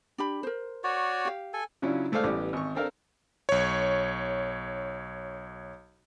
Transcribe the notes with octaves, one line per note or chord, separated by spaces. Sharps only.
D4 G4 B5
A#4 C5
F#4 C#5 D5
G4 F5
A4 G#5
C#3 F#3 C#4 D4 E4 F4
G#3 A3 A4 C5 D5 F5
A1 E3 G3 B3 D5
G#1 C#6
C4 D4 A4 A#4 F5
B1 C#5